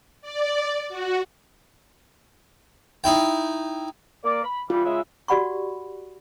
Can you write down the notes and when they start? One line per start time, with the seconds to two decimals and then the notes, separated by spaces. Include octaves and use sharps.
0.22 D5
0.89 F#4
3.04 D#4 E4 G5
4.24 A#3 D5
4.44 B5
4.70 E3 G3 F4
4.85 C#3 G#3 E5
5.28 F#4 G4 D5 F#5 B5 C#6